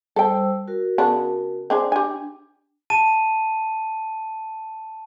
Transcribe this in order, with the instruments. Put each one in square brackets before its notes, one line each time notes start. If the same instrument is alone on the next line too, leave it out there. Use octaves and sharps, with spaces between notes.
[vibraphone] G3 C5 E6 [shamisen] A4 G5
[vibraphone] F#4 A#4
[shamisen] C#3 B3 D4
C4 D4 G#4
[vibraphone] D4 [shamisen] G4 G#5
[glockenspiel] A5 D#7